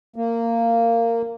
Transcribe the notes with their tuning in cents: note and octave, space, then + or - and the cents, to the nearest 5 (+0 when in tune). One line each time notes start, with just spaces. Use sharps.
A#3 -15